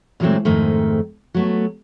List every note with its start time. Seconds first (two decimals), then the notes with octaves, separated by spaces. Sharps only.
0.20 A#2 E3 F#3 G#3 A3 C4
0.45 F2 G#2 D#3 G#3 A3
1.34 F#3 A3 B3